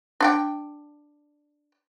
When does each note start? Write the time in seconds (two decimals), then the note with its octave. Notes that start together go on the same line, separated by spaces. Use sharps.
0.20 D4 F#5 G5